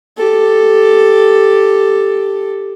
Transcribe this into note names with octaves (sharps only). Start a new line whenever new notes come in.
G4 A4